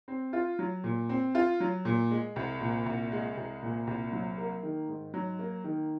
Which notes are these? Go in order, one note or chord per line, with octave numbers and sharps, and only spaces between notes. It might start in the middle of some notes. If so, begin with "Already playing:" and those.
C4
F4
F#3
A#2
C4
F4
F#3
A#2
G#3
C2
A#2
C2
G#3
C2
A#2
C2
F#3
A#3
D#3
G#2
F#3
A#3
D#3